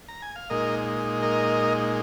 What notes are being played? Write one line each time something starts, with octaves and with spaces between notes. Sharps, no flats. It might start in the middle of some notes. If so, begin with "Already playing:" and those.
A#5
G#5
F5
A#2 G#3 D#4 A#4 D#5
A#4 D#5